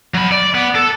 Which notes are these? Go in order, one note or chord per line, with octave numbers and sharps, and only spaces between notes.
F#3 B5
D5
B3
A4